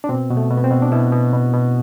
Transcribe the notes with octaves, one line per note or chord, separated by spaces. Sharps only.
D4
B2 C4
B2
A3
B2
B3
C4
B2
D4
B2 E4
B2
B2
B2